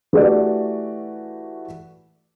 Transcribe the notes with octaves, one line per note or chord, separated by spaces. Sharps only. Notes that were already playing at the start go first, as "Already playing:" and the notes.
E3 A3 F#4 G4 B4 D5